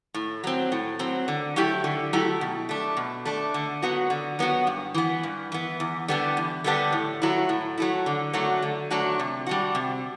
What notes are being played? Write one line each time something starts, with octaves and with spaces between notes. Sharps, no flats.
A2
F#3 C4
A2
F#3 C4
D3
F#3 A3 E4 G4
D3
F#3 A3 E4 G4
B2
A3 D4
B2
A3 D4
D3
F#3 B3 F#4
D3
F#3 B3 F#4
G2
E3 B3
G2
E3 B3
E2
D3 G3 B3 D4
E2
D3 G3 B3 D4
A2
F#3 A3 E4
A2
F#3 A3 E4
D3
F#3 A3 D4 F#4
D3
F#3 A3 D4 F#4
C3
G3 D4 F#4
C3